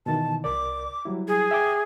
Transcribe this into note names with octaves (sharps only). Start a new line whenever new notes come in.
B2 D#3 E3 A5
C2 A#4 D5 D6
F#3 G3 E4
G#4
E5 G5 D6